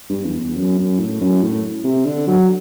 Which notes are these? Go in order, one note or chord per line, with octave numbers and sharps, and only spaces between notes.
G2
E2
E2
F#2
F#2
A2
F#2
A2
C3
D3
F#3